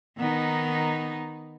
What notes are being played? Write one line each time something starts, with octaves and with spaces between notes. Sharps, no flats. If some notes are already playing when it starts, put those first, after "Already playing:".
D#3 B3 D#4